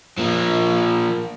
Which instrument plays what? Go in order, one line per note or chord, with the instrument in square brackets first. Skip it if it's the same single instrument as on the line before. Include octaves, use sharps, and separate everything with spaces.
[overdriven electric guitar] F3 A#3